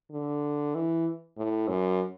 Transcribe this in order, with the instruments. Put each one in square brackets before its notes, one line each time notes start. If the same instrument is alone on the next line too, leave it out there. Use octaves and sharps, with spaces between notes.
[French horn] D3
E3
A2
F#2